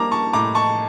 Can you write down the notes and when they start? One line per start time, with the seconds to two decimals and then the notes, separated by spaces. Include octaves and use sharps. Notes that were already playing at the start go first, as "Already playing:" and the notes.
Already playing: G3 A#3 A5 A#5 D6
0.12 A5 C#6
0.33 A2 A#5 D6
0.55 A5 C#6